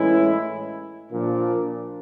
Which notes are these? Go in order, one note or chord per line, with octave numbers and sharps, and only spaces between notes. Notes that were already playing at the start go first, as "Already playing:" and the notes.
Already playing: A2 E3 G#3 C#4 E4
A#2 F3 A#3 D4